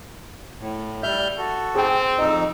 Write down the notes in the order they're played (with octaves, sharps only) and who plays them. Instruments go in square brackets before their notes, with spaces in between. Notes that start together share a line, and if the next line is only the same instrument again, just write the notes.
[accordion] A2
[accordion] G3 F6 G6 [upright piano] E5
[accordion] F#4 A4
[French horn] C4 [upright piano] G#4 G5
[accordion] F2 D#4 [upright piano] D#5 E6